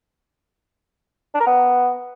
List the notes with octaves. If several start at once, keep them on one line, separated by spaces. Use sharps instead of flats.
D4
A#4
B3